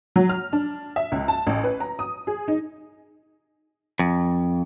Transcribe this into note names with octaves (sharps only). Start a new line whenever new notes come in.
F#3
F6
D4
E5
C#2
A5
A1
B4
A#5
D#6
G#4
D#4
F2